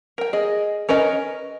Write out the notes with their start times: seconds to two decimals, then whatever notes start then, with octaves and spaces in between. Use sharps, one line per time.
0.18 A#4 G5
0.33 G#4 D#5
0.89 C#4 A#4 B4 D#5